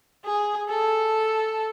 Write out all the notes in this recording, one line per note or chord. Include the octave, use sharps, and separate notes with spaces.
G#4
A4